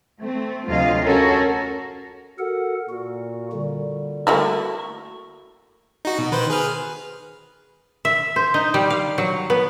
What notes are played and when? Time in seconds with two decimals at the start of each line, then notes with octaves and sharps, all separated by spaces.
0.20 A3 C4
0.69 D2 C3 F#3 F4 D#5 F5
1.03 C#4 F#4 A4 A#4
2.39 F#4 A4 A#4 F#5
2.89 A#2 F#4
3.53 D3 G3
4.27 A3 A#3 E4 F#4 C#6
6.05 D#4 F#4
6.18 B2
6.32 D#3 B4 C5
6.50 G#4 B4 F6
8.05 E5
8.36 C5
8.54 D#4
8.74 G3
8.90 F5
9.18 F#3
9.50 B3